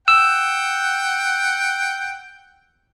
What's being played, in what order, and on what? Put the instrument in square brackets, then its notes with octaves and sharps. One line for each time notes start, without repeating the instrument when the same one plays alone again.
[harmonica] F#5 G5 [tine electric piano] E6